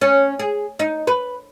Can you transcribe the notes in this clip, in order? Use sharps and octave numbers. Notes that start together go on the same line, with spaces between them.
C#4
G#4
D#4
B4